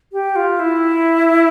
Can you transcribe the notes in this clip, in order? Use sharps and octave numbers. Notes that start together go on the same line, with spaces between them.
G4
F4
E4